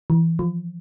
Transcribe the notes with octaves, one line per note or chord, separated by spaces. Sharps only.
E3
F3